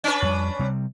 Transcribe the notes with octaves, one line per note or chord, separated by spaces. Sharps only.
C#4 D4 B4
F2 G3
C3 G3 C4